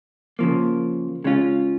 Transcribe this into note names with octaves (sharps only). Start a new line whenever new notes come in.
C#3 F3 A#3
C#3 G#3 C#4 F4